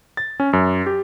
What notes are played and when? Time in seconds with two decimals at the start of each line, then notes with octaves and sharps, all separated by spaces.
0.17 A6
0.40 C#4
0.53 F#2
0.86 G4